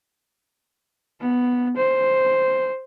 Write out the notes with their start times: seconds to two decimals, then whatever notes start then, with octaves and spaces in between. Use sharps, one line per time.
1.21 B3
1.77 C5